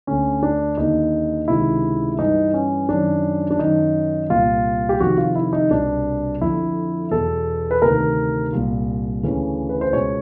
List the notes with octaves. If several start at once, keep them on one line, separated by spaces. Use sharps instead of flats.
D2 D3 C#4
D4
D#2 D3 D#4
C#2 C3 D#3 E4
G2 E3 D#4
C#4
F#2 D#3 D4
D4
F#2 D#3 D#4
C2 A#2 F4
G4
F2 C3 D#3 F#4
F4
E4
D#4
C2 B2 D4
F2 D3 E4
E2 B2 A4
B4
D2 C3 D#3 A#4
C2 A#2
D2 C#3 E3
B4
C5
C#2 B2 C#5